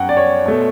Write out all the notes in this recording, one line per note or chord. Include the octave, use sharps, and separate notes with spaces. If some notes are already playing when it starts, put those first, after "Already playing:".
Already playing: F#2 F#5 G5
D5
C#5
B2 A3